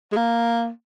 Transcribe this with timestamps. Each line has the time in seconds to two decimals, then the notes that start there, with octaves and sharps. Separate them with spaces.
0.12 G#3
0.16 A#3